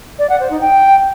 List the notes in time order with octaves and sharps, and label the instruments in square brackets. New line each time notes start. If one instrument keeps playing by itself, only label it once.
[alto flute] D5
F#5
C5
D#4
G5